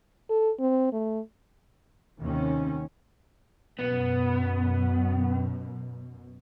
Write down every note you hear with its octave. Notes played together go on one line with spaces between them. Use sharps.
A4
C4
A3
D#2 C3 D#3 C4 C#4
F#2 B2 B3